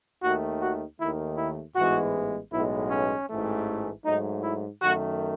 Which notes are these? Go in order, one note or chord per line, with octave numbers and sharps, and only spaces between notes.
D#2 D#3 A3 F#4
F#4
D#2 D#3 A3 E4
E4
A1 G#2 E3 G#3 B3 F#4
B1 A2 G#3 B3 E4
C#4
A1 G#2 E3 A3
G#2 F#3 A3 D#4
E4
F#2 D#3 A3 F#4